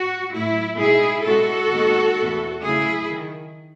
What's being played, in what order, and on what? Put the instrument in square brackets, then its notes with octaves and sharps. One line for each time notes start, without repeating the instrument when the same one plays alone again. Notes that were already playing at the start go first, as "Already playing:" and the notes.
Already playing: [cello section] F#4
A2 F#3 A3 E4
B2 G#3 D#4 E4 G#4
B2 G#3 C#4 E4 F#4 A4
D#2 D#3 G#3 B3 D#4
E2 B2 A3 E4
C#3 F#3 A3 E4 G#4
D#3